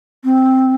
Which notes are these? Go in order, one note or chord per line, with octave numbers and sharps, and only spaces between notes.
C4